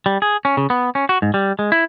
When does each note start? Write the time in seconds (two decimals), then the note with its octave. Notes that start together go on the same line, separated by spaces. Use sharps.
0.06 G3
0.22 G#4
0.45 C#4
0.57 C#3
0.70 B3
0.95 C#4
1.09 F#4
1.22 G#2
1.34 G3
1.59 G#3
1.72 E4